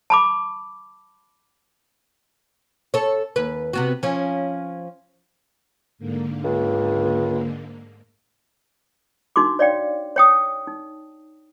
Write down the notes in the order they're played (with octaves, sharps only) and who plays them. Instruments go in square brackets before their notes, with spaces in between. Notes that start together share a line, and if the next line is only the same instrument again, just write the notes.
[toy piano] A5 B5 D6
[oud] A4 C#5
D#2 B4
C3 B3 F#4
F3 C#4
[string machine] G#2 D3 A#3
[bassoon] C#2
[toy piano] D4 D#4 F#4 C6 D6
C#5 D5 F5 G5
C#5 G5 D#6
D#4